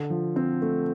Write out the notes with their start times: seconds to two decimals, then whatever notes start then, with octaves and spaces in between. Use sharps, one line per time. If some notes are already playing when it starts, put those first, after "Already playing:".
Already playing: D3
0.10 F3
0.36 C4
0.62 A3